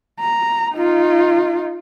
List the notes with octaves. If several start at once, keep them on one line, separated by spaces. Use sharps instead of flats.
A#5
D#4 F4